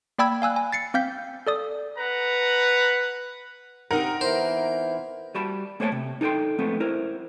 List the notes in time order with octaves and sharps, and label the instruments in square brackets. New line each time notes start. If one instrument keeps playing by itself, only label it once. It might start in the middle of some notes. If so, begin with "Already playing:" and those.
[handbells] A#3 D5 G5 B5 E6 G#6
F5 G#5 E6 F#6
G#5
A6 C7 C#7
C4 F5 G6 B6
A4 D5 D#6
[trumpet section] B4 F#5 A#5
[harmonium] C3 [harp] C4 D#4 F#5 [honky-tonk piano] A#4
[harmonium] E3 B3 E4 [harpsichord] C5
[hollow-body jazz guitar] G3 F#4 A5 B5
A3 A#3 C5 C#5 G5 A5
C3
D#4 A4 B4 G5 C6
F3 G#3 A3 B3 C4
E4 A#4 C5